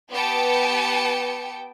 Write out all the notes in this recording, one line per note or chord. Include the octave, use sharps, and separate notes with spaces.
B3 G4 B4 G5 A5 C#7